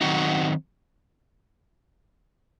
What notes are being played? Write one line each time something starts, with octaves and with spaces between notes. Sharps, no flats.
D#3 F#3 C4 D#4 F#4